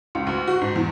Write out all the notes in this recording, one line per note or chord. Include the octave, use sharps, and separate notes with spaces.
C#2
D2
F#4
G#2
E2